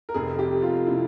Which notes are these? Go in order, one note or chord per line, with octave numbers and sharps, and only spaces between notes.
A#4
F1 F2 C3 G#4
G4
F4
C3 E4